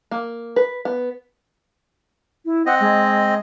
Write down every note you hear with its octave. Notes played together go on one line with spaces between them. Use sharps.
A#3
B4
B3
E4
C4 D#5 F#5
G#3